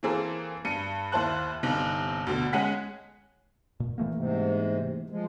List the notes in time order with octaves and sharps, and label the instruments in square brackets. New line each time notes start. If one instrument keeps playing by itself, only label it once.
[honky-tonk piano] E3 A#3 C4 G#4 A4
G2 C#7 D#7
D#2 E4 C5 A5 F#6
G1 C3 D#4 F#6
D2 B2 D3
G#3 C#4 G#4 F#5 B6
[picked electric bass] A#2
E3 A3 A#3
[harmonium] G#2 C3
F3 G#3